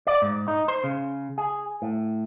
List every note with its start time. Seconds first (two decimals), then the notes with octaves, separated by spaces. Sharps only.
0.07 D5
0.22 G#2
0.48 D#4
0.68 C5
0.84 C#3
1.38 G#4
1.82 A2